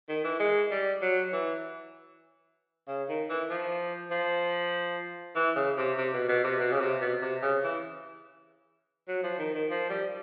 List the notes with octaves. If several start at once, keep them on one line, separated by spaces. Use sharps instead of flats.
D#3
E3
G#3
G3
F#3
E3
C#3
D#3
E3
F3
F3
E3
C#3
C3
C3
B2
B2
C3
B2
C#3
C3
B2
C3
C#3
E3
F#3
F3
D#3
D#3
F3
G3